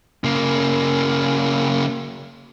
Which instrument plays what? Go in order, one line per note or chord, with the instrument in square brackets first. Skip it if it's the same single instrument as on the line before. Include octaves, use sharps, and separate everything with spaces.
[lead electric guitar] C#3 A#3